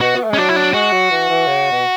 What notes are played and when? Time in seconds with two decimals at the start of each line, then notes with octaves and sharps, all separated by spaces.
0.01 B2 F#4
0.15 B3
0.24 A3
0.30 G#3
0.34 C#4
0.37 F#3 D4
0.49 E4
0.56 D4
0.73 G#3 F#4
0.92 F#3
1.10 E3
1.29 E3
1.47 C#3
1.71 B2